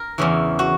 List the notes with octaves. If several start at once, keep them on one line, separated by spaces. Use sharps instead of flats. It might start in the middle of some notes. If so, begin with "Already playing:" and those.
Already playing: A#4
E2 C#3 E3
F#4